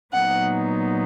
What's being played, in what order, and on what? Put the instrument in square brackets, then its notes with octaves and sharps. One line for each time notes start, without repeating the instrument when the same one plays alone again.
[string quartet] A#2 F#3 B3 D#4 F#5